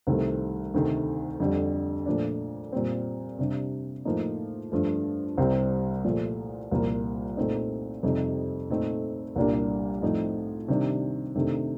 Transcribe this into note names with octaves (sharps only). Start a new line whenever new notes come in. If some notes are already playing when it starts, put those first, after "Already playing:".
C2 C3 D#3 A3 C4
D2 C3 D#3 A3
F2 D3 G3
A#2 F3 A3 D4
A#2 G3 C4
C3 G3 D4
A2 F3 A#3 D#4
G2 F3 A3
C2 C3 G3 C4
A#2 F3 A3
C2 A#2 F3 A#3
A#2 A3 C4 D#4
F2 C3 G3 C4 D#4
A#2 A3 C4 D#4
C2 A#2 G3 A#3 D4
A2 F3 C4 D#4
C3 D#3 G3 D4
C3 D#3 A3 D4